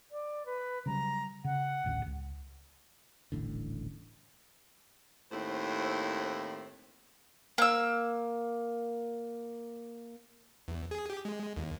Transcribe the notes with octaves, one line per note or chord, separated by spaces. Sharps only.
D5
B4
C#3 F#3 G3 A#5
C#3 F#5
D#1 A1 D2
C#2
D#1 A1 A2 D3
D#2 A2 C4 E4 C5
A#3 E6
E2
G#4
G4
G#3
D#2